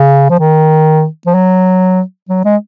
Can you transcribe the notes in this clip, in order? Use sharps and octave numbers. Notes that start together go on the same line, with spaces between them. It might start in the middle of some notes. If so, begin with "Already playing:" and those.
Already playing: C#3
F3
D#3
F3
F#3
F#3
G#3